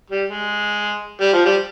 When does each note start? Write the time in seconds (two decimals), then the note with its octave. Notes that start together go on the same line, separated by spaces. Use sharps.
0.10 G3
0.28 G#3
1.21 G3
1.33 F3
1.45 G3